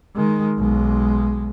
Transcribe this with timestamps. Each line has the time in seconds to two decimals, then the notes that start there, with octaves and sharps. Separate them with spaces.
0.15 D#3 G#3
0.57 B1 G#3